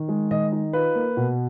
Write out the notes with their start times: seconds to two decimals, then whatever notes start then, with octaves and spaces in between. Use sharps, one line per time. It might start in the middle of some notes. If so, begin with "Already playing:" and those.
Already playing: D#3
0.08 G#3
0.31 D#3 D#5
0.52 D#4
0.73 F4 B4
0.95 A#3
1.17 B2